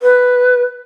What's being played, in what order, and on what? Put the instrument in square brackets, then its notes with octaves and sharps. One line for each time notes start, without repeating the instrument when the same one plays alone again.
[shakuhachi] B4